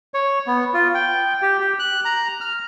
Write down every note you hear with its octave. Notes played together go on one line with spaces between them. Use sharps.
C#5
B3
F4
G5
G4
G4
F#6
A#5
F6